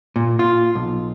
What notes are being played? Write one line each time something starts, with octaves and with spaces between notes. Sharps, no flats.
A#2
F4
B1